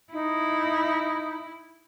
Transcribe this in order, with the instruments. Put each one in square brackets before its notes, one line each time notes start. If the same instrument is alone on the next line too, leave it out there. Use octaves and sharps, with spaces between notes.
[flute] D#4 [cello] E4